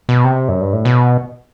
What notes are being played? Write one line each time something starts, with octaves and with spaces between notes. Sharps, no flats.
B2
C3
F#2
G2
A2
B2